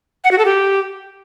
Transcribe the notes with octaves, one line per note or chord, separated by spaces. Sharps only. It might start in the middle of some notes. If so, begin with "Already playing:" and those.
F#5
F#4
A4
G4